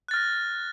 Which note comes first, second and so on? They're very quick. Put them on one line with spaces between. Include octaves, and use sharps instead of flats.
F#6 A6 F6 A#6